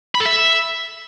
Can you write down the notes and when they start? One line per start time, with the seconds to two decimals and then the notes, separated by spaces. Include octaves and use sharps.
0.15 B5
0.20 A4
0.26 E5